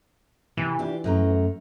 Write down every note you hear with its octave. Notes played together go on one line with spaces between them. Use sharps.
C3 E3
D4 F4 G4
F#2 A3 A#5